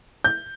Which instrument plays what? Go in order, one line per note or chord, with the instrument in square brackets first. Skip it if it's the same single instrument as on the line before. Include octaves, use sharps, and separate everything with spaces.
[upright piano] G6